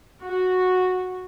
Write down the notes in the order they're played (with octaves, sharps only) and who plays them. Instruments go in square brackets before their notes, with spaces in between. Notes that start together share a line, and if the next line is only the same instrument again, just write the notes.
[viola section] F#4